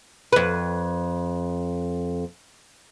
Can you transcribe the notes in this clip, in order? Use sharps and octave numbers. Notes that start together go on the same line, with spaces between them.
F2 B4